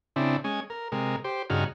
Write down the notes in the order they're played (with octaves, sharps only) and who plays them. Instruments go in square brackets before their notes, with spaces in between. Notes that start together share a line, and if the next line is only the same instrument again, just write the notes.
[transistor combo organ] C#3 C4 D4 E4
G#3 C#4 G#5
A#4
C3 G#3 A#4
G4 C5
G2 C#3 D#4 F#4 G#4 F6